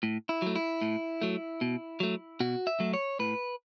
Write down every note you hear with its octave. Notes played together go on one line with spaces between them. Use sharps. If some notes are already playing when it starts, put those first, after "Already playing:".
A2
E4
F#3 A3
E4
A2
F#3 A3
B2
F#3 A3
B2 F#4
E5
F#3 A3
C#5
A2 B4